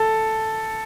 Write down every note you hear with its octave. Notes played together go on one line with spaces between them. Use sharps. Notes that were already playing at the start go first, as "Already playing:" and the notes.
Already playing: A4